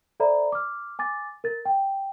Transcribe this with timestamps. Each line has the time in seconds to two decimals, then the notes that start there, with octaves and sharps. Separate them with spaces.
0.20 A4 C5 D5 E5 A#5 B5
0.52 D6 F6
0.99 G#5 D6 A6
1.44 A#4 A6
1.65 G5